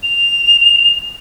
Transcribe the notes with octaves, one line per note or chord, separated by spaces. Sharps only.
F7